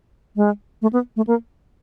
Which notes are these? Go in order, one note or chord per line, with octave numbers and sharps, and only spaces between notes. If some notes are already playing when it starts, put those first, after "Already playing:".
G#3
A3
B3
A3
A#3